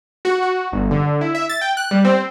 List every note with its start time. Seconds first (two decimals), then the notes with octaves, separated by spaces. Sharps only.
0.25 F#4
0.43 F#4
0.72 G1
0.91 D3
1.21 E4
1.35 E5
1.49 A6
1.61 G5
1.77 F#6
1.91 G3
2.05 C4